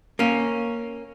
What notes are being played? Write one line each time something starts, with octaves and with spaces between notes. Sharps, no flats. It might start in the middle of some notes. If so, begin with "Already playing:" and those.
A#3 C#4